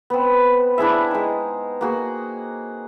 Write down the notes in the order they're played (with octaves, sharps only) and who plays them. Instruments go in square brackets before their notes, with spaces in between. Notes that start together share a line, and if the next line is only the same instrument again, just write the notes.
[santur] B3 C4
D4 E4 G#4 E5
G#3 D#4
A#3 F#4 G#4